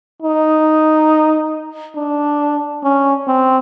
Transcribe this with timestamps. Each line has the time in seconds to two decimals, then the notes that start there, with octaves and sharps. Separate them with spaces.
0.22 D#4
1.96 D4
2.83 C#4
3.28 C4